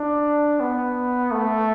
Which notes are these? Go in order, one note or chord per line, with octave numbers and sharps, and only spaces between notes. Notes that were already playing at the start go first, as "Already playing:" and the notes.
Already playing: D4
B3
A3